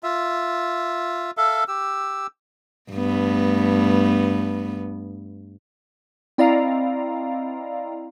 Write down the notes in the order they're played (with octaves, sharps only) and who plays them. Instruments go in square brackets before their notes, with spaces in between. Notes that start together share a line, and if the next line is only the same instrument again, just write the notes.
[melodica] F4 E5
A4 E5 F5
G4 E6
[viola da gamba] G2 A3 B3
[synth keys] C4 E4 D5 D#5 F5 A#5